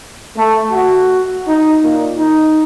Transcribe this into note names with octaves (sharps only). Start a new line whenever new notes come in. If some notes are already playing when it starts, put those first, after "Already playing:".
A3
F#4
D#4
A#2
D#4